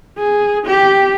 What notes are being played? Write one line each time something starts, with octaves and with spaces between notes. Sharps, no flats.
G#4
G4